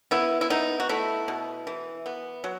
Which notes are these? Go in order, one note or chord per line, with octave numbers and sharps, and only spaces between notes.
B3 E4
E4
B3 D#4
F#4
A3 E4
B2
E3
B3
F#3